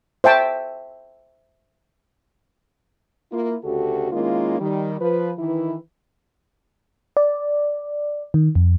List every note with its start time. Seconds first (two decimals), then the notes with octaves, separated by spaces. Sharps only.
0.24 C5 E5 G5 A5 C#6
3.32 A#3 E4 F4
3.64 D2 C#3 F#4 G4 A4
4.12 D#3 G#3 A#3 C#4 E4 F4
4.60 D#3 G3
5.00 F3 B4
5.38 D#3 E3 E4
7.17 D5
8.34 D#3
8.55 F2